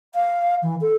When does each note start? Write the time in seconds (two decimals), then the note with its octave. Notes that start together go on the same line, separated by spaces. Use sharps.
0.14 F5
0.62 E3
0.81 A4